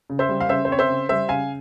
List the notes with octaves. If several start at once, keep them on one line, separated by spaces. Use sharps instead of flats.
C#3
C5 E5
G3
F5
C#3 C5 E5
C5
C4 C#5
C5 E5
C#3
G3 C5 E5
C#3 F5 G#5